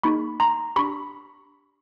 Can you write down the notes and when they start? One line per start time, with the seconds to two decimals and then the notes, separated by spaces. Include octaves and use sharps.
0.03 A#3 D#4 G#4 B5 C#6
0.40 A#5 C6
0.76 D4 G4 B5 C#6